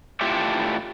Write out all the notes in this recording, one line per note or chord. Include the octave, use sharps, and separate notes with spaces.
A2 F4 G4 A4 E5